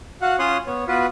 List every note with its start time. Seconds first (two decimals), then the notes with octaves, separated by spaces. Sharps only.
0.22 F#4 F5 F#5
0.39 C#4 F4 C#5 C6 D#6 F#6
0.67 B3 C#5
0.87 B3 F4 F#4 B4